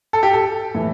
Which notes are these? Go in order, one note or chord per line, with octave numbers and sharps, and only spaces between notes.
A4
G4
A4
A2 E3